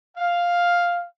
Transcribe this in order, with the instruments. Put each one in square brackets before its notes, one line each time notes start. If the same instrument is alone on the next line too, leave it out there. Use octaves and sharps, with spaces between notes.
[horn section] F5